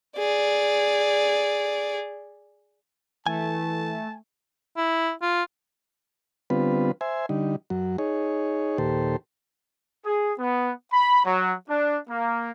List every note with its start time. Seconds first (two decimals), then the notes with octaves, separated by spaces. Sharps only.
0.17 G#4 D5
3.27 E3 A3 G#5 A5
4.77 E4
5.22 F4
6.50 D3 G3 B3 C4 F4 B4
7.01 C5 E5 G#5
7.29 D3 G3 D#4
7.70 F#2 F#3
7.98 D#4 G#4 C#5
8.78 D#2 A#2 G4 A4 C5
10.06 G#4
10.39 B3
10.92 B5
11.25 F#3
11.70 D4
12.09 A#3